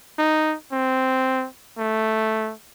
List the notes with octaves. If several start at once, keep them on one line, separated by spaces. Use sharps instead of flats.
D#4
C4
A3